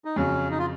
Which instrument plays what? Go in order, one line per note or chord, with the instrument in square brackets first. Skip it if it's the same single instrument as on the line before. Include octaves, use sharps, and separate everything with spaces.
[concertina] D#4
[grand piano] F2 C#3 F#3 [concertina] C#4
[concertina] D#4
F4